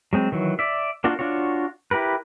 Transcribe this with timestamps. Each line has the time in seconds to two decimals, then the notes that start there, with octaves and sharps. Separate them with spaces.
0.13 F#3 G#3 C4
0.32 D#3 E3 F#3
0.59 D5 E5
1.04 A#3 D4 F4 F#4
1.19 D4 F4 F#4 C#5
1.91 E4 G4 A#4 B4